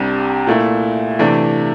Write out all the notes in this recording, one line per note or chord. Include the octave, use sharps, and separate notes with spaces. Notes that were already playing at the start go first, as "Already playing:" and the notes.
Already playing: C2 C3 G3 D4 G4
A#2 A3 E4
C3 E3 A3 D4